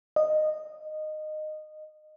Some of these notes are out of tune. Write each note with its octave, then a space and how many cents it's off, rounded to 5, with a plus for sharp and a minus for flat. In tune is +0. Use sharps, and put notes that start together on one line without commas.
D#5 -15